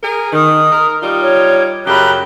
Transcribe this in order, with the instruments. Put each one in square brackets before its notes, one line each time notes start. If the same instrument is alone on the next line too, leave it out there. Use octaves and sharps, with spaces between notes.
[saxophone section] G#4 A#4
[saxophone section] D#3 [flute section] D#6
[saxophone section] A#4
G3 D#4 F4
[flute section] C#5
[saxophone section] F#2 C#3 G4 [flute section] A#5 B5 F#6